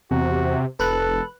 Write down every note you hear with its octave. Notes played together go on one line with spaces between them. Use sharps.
E2 C3 F#4
F1 A4 B4 F#6